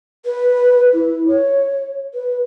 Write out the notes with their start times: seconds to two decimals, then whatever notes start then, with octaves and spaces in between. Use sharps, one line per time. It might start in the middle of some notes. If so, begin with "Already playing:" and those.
0.25 B4
0.94 E4
1.28 C#5
2.14 B4